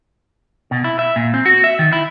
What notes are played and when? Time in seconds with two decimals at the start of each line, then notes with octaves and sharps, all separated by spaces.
0.71 B2
0.84 E4
0.99 E5
1.16 A#2
1.34 C4
1.46 F#4
1.64 E5
1.79 D#3
1.92 E4